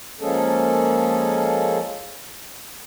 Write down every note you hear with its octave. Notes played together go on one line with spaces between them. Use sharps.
F3 G#3 A#3 C#4 G#4 A4